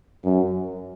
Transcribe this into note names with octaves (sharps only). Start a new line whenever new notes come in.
F#2